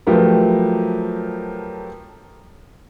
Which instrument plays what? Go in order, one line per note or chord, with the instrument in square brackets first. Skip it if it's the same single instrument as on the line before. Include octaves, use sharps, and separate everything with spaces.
[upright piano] F3 F#3 A3 G4 A#4 B4